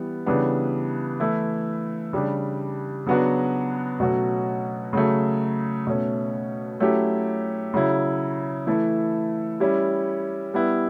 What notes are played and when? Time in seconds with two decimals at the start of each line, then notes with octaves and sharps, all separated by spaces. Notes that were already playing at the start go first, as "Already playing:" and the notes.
Already playing: E3 G3 B3
0.26 C#3 E3 G3 B3 D4
1.20 E3 A3 E4
2.13 C#3 G3 D4 G4
3.06 C#3 F#3 B3 D4 F#4
4.00 B2 F#3 A3 C#4 F#4
4.93 C#3 F#3 A3
5.87 B2 A3 C#4
6.80 F#3 A3 C#4 E4 G4
7.74 C#3 F#3 C#4 E4
8.67 E3 A3 E4 A4
9.60 G3 C#4 E4 G4
10.54 G3 B3 E4